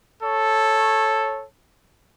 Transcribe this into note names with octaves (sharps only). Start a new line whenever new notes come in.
A4 C#5